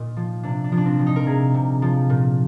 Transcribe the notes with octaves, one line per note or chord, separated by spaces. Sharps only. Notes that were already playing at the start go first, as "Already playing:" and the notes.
Already playing: A#2 D#4
F3
C3 D4
D4
F3
D4
C4
F3
D#4
A#4
C3 G#4
C3
F3
A#2